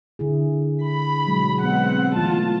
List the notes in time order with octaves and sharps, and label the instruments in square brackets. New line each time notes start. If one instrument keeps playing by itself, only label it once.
[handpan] D3 E4 G#4
[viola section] B5
[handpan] B2 F#3 G#3
[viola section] G#3 C4 F#5 [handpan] B3
[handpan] E3 A3 [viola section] F4 A5